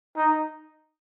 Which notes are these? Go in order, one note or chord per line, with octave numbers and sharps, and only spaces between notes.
D#4